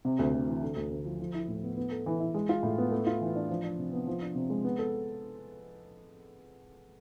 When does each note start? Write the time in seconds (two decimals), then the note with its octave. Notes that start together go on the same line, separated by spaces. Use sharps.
0.05 C3
0.19 D2
0.33 D2
0.47 E3
0.62 D3
0.76 D2
0.91 D2
1.05 F3
1.20 F3
1.34 E4
1.48 A2
1.63 B3
1.77 B3
1.91 A4
2.06 E3
2.20 E4
2.34 G#3
2.49 F4
2.63 A2
2.78 B3
2.91 A3
3.07 F4
3.21 E3
3.36 D4
3.49 F3
3.64 D4
3.78 C3
3.93 B3
4.07 F3
4.22 D4
4.35 C3
4.50 G#3
4.64 B3
4.79 A4